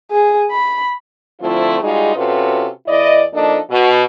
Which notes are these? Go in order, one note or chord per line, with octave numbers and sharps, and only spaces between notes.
G#4
B5
D3 F3 A3 C4 E4 F4
G3 G#3 D#4 F4 F#4 G#4
C3 C#4 F4 F#4 A4 B4
E2 E4 D5 D#5
F3 A#3 D4 D#4 A4 D#5
B2 F#4